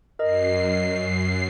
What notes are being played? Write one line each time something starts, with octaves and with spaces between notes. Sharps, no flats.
F#2 A#4 D#5 C7